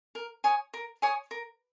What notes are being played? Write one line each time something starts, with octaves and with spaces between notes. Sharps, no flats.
A#4
C#5 G#5 D#6
A#4
C#5 G#5 D#6
A#4